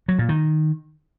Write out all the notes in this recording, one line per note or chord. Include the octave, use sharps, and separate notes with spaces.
F#3
A#2
D#3